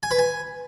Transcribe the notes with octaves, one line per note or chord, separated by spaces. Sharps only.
G#5
B4
G#5